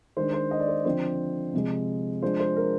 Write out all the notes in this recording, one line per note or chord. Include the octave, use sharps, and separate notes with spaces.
D#3 G#3 D4 C5
C5
D#5
D5
C5
D3 F3 C4 C5
C3 F3 G#3
F3 G#3 D4 C5
C5
A#4